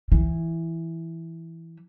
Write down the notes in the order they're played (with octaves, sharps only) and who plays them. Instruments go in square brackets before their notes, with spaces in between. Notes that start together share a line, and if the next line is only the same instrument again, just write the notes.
[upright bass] E3